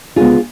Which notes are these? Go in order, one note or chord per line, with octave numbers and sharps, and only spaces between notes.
D2 C#3 G#3 B3 F4 G#4